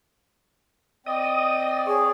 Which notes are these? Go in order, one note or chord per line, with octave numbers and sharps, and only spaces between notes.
C4 D5 D#5 D#6
G#4 C#5